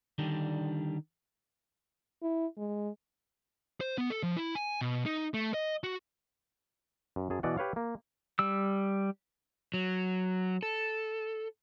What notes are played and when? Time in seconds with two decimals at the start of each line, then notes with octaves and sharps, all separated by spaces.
0.18 D3 D#3 G3 D4
2.23 E4
2.58 G#3
3.80 C5
3.98 B3
4.10 A4
4.23 F3
4.36 E4
4.55 G#5
4.81 B2
5.06 D#4
5.34 A3
5.54 D#5
5.84 F#4
7.16 F#2
7.30 F#2 G#4 A5
7.43 B2 E3 D5 D#5 F#5
7.57 G4 B4 C#5 F5
7.76 A#3
8.39 G3 E6
9.74 F#3
10.63 A4